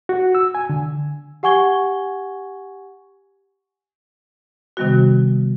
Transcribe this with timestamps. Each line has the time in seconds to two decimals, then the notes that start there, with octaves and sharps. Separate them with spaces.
0.09 F#4
0.35 E6
0.55 G#5
0.69 D3
1.43 G4 F#5 G#5 C#6 G#6 G7
4.77 C3 D#3 G3 B3 F#4